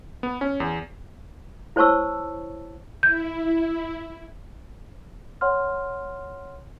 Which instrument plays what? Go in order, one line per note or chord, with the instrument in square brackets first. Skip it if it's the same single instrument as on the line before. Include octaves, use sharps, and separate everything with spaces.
[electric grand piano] B3
C#4
E2
[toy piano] E4 C5 C#5 A5 C#6 E6
[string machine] E4 [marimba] G6
[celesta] C#5 F#5 C6 F6